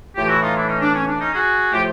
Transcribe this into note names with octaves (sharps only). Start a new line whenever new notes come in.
A2 E3 A3 F4 G4
E4 F#4
D#4 F4
D4 E4
C#4 D#4
D4
C#4
D4
C#4 D#4
F#4 G#4
A2 F3 A3 F4 G4